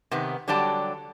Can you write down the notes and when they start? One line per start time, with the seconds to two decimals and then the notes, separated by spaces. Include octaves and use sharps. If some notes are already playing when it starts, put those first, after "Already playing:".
0.11 C3 D#3 B3 G4
0.48 D3 F#3 G3 G4 D5 A5